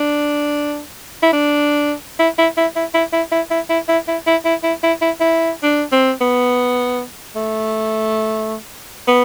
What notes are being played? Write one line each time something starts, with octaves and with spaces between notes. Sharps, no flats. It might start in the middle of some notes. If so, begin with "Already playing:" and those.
Already playing: D4
E4
D4
E4
E4
E4
E4
E4
E4
E4
E4
E4
E4
E4
E4
E4
E4
E4
E4
E4
D4
C4
B3
A3
B3